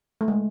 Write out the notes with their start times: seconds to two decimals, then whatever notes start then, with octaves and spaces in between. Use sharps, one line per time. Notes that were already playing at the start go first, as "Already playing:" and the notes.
0.21 A3
0.28 G#3